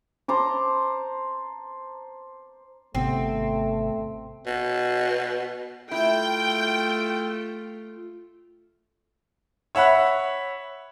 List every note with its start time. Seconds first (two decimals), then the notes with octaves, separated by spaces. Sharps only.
0.28 C5 A5 A#5 D6
2.95 G#1 C3 A3 B3 C4
4.47 B2
5.91 A3 E4 F4 G5
9.75 C#5 E5 F#5 B5 F#6